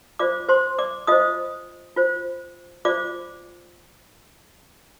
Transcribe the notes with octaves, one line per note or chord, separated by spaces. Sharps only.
F4 C5 D5 D6
C5 C6
D5 D6
F4 C5 D#5 D#6
F4 C5
F4 C5 D5 D6